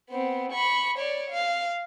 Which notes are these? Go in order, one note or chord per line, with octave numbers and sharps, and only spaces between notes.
B3 C4
B5 C#6
C#5 D5
F5